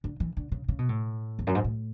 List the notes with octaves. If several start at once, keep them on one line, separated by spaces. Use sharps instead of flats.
D3
E3
D3
C#3
C#3
B2
A2
E2
F#2
G#2
A2